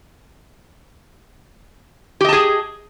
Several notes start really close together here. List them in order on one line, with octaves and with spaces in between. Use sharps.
G4 D#5 A5 G#4